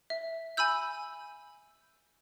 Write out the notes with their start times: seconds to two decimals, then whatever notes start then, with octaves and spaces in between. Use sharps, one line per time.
0.10 E5
0.57 G#5 B5 E6 G6